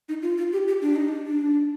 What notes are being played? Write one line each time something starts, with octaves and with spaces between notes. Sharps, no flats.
D#4
F4
F4
G4
G4
D4
D#4
D4
D4